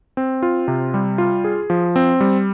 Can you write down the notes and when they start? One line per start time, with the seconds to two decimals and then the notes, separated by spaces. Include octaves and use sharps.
0.17 C4
0.43 F4
0.68 C3
0.94 G3
1.18 F4
1.44 G#4
1.70 F3
1.96 C4
2.21 G3